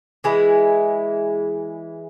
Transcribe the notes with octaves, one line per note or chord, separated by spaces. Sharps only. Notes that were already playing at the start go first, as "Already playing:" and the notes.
E3 G#3 E4 G#4